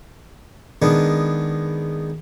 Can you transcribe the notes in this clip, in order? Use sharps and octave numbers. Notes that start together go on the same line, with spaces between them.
D#3 G#3 B3 D4